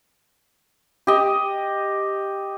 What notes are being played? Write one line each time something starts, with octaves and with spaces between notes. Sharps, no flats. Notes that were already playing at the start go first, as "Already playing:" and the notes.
G4 D#5